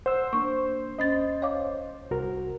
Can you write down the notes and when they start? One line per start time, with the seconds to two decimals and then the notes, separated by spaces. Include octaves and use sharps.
0.06 C5 F#5 E6
0.33 A#3 D4 C#6
0.99 D#2 C#4 D#5 A6
1.42 C#5 F5 D6
2.11 C2 F#4 A#4